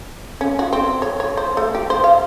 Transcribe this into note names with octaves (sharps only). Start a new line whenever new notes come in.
C#4
F#4
C4
C#5
C#5
C5
A3
G4
C5
F5